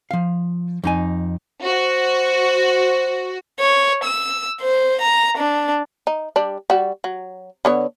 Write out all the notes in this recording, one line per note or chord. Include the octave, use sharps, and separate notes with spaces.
F3 F5
F2 D#4 G#5
F#4 C5
C#5
E6
C5
A#5
D4
D#4
G3 D4
G3 F#4
F#3
D3 B3 C#5